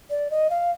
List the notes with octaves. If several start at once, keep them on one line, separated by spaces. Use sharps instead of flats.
D5
D#5
F5